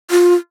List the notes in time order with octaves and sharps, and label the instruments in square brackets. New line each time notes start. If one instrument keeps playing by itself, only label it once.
[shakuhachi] F4